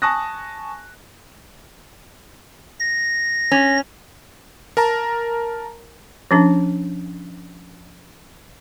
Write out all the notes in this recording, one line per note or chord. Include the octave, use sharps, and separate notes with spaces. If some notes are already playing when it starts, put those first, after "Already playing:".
G#5 A5 C#6 D#6 F#6 A#6
A#6
C#4
A#4 A5 A#5
F3 C#4 D4